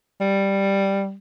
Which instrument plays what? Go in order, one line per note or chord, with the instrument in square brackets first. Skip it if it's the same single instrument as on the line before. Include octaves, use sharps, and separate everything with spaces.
[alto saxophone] G3